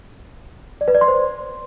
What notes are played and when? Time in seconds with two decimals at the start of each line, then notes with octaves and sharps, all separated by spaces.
0.81 D5
0.88 B4
0.94 D5
1.01 C6
1.08 C5